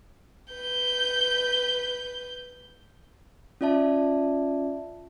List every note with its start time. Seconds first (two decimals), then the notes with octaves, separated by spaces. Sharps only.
0.54 B4 G6
3.61 C#4 F4 D5 E5 A5